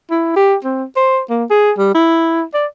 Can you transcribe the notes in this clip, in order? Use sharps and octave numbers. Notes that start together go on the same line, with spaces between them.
E4
G4
C4
C5
A#3
G#4
G3
E4
D5